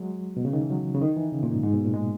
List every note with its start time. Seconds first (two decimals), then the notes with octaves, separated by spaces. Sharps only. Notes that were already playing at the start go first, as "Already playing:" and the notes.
Already playing: F#3 G#3
0.37 B2
0.45 C#3
0.53 D#3
0.61 E3
0.70 F#3
0.94 C#3
1.02 D#3
1.17 E3
1.32 C#3
1.43 A#2
1.53 G#2
1.63 G#2
1.73 B2
1.84 A#2
1.94 G#3